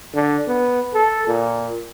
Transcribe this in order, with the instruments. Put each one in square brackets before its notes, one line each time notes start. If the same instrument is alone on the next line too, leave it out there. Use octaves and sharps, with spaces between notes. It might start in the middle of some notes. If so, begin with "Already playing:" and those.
[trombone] D3
B3
A4
A#2